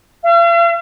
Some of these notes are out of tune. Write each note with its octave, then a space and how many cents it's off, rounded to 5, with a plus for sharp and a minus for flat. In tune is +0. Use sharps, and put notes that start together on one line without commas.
F5 -45